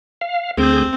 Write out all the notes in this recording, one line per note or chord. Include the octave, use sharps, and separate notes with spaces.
F5
D2 C4 G#4 G6